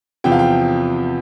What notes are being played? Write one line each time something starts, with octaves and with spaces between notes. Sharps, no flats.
E2 C3 F3 G5
F5
G5